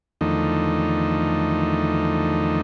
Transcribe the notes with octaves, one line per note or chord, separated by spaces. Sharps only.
E2 D3 D#3 F3 A3 D#4